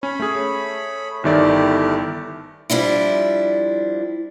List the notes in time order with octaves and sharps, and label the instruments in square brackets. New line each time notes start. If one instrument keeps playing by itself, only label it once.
[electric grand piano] C#4 [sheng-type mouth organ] C#5 B5
[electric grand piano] A3 G#4
[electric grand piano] G1 D#3 D5 [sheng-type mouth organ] A3 E4 G4
[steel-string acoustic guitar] F3 G3 D4 E4